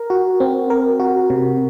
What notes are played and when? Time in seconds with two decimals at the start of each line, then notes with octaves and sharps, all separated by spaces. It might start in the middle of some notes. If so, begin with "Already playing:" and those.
Already playing: A#4
0.10 F#4
0.40 C4
0.70 A#4
1.00 F#4
1.30 C3